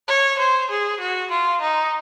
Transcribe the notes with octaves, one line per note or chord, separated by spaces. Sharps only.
C#5
C5
G#4
F#4
F4
D#4